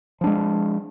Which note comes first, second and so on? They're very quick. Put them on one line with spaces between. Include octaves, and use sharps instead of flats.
F3 D4 G#3